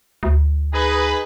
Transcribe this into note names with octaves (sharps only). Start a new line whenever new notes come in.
D2
D#4 G#4 B4